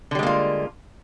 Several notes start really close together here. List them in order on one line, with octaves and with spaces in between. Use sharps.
D3 G3 G#3 A#3 F4